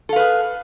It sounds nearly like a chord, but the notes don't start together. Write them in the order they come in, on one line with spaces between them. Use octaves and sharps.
A4 F5 B4 G#4